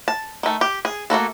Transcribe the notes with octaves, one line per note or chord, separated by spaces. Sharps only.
A5
D#3 A3
G4
G#4
A3 A#3 F#4 A4